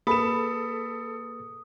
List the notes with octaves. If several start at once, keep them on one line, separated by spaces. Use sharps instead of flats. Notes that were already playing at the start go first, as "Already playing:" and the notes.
A#3 G#4 A4 B4 B5 D#6 E7